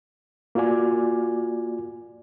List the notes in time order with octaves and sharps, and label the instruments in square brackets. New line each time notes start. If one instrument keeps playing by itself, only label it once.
[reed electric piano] A#3 F4 F#4 D5 G#5